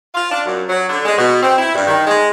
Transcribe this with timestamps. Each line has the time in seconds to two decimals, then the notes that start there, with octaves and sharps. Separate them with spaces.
0.15 F4
0.32 D4
0.46 F#2
0.69 F#3
0.90 D3
1.05 G#3
1.18 B2
1.42 C4
1.58 E4
1.75 G2
1.88 D#3
2.07 G#3